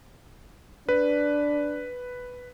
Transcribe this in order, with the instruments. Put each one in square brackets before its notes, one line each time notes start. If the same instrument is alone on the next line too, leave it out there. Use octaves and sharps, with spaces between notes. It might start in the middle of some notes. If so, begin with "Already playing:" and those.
[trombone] D4 [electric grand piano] B4